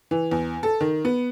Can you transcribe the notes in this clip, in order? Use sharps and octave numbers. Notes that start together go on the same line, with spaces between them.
E3
E2
A4
D#3
B3